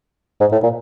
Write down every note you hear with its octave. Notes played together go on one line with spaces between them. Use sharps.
G#2
A2
A#2